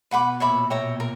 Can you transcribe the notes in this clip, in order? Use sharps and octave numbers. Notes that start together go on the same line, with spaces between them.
B2 B4 F#5 B5 D6
A#2 C#5 E5 B5 D6
C#5 E5 G5 A#5
A#4